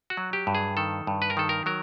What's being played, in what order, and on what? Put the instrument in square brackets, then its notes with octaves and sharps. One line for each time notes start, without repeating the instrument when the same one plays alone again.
[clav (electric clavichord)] F#4
F#3
G4
G2
G#4
D#3 A4
G2
B4
A#4
D#3 A4
A#4
F#3 A#4